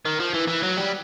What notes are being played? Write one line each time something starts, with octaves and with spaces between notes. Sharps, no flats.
D#3
F3
E3
E3
F#3
G3